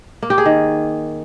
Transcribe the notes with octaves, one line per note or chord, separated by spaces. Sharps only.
A#3
G4
G#4
D#3